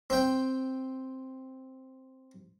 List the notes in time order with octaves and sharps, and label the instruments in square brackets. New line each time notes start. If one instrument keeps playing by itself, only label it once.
[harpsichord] C4 G5